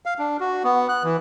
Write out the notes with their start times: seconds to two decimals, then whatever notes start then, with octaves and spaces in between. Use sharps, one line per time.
0.06 F5
0.19 D4
0.40 F#4
0.64 B3
0.89 F#6
1.04 E3